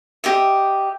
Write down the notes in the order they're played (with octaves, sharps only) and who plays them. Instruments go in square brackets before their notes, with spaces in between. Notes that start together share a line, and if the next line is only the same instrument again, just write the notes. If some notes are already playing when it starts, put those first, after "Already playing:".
[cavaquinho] G4 D#5 E5